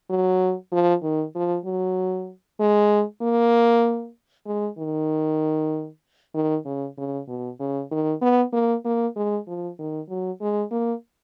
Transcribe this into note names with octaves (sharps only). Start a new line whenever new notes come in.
F#3
F3
D#3
F3
F#3
G#3
A#3
G#3
D#3
D#3
C#3
C#3
B2
C#3
D#3
B3
A#3
A#3
G#3
F3
D#3
F#3
G#3
A#3